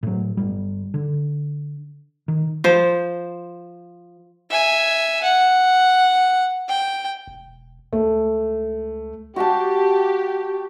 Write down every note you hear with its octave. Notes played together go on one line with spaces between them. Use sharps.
A2 F#3
G1 G3
D3
D#3
F3 C5
E5 G#5
F#5
G5
E1
C#2 A3
F#4 G4 F5 A5